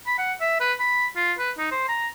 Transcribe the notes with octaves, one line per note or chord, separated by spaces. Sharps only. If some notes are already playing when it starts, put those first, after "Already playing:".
B5
F#5
E5
B4
B5
F4
B4
D#4
C5
A#5